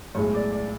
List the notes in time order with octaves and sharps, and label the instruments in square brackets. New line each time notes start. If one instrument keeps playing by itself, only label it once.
[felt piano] B1 A2 G#3 [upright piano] C#5
[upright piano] D5
D5